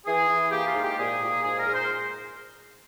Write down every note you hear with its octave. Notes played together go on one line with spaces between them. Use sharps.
E3 G#4
E3
A#3 G4
F4
G#2
G4
A#2 G#4
A#2
G#2 G#4
A#4
G#2
C5